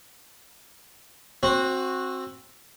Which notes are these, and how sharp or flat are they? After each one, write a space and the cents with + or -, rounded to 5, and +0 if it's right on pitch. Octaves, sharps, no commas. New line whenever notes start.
C4 +15 F#4 -10